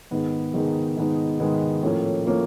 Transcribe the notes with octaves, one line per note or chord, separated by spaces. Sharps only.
G#2 D#3 G#3 B3 D#4
G#2 D#3 G#3 B3 D#4
G#2 D#3 G#3 B3 D#4
G#2 D#3 G#3 B3 D#4
A2 F3 A#3 C#4
A2 F3 A#3 C#4